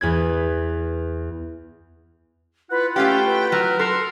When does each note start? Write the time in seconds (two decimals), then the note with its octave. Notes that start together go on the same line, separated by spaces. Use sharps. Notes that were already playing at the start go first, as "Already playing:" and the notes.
0.01 E2 B4 G#6
2.71 E4 F4 B4 F#5
2.96 A3 C#4 G4 F5 G5
3.25 B4
3.52 F#3 A#4
3.79 A4 A#4 C6